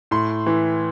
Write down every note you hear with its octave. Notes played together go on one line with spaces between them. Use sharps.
A2 C6
E3